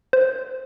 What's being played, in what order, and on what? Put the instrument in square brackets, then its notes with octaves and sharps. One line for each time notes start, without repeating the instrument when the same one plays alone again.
[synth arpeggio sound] C5